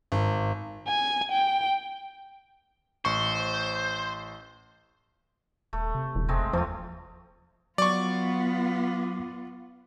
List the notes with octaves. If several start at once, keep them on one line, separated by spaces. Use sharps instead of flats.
G#1
G#5
G5
A1 C5 C#6
D#1 A3
C3
E1
F#1 G#3 A3 C4
E2 F3 A3 F4
F#3 B3 F4 D5 C#6